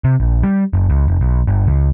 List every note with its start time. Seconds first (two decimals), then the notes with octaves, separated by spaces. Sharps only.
0.04 C3
0.20 A#1
0.44 G3
0.73 F#1
0.90 C#2
1.08 F1
1.21 B1
1.47 G1
1.67 C#2